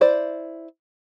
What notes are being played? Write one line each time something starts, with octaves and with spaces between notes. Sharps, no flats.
E4 C5 D5